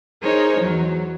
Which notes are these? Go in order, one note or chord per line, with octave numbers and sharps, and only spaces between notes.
D#4 G#4 A#4 C5 C#5
E2 F#3